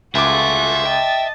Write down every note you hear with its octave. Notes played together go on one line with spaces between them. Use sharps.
C#2 F4 F#4 G#4 A4 E5 D6
D#5 G5 A5